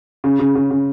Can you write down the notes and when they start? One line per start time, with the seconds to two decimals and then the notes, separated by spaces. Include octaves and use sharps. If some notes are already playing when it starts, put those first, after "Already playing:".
0.24 C#3
0.39 C#3
0.55 C#3
0.71 C#3